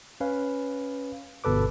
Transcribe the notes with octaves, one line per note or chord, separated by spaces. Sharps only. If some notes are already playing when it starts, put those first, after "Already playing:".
C#4 B4 F5
G1 B2 A4 B4 D6